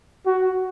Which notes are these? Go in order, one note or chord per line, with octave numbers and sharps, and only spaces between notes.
F#4